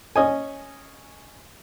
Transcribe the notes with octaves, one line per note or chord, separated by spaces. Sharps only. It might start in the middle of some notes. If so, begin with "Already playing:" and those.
C#4 D#5 G#5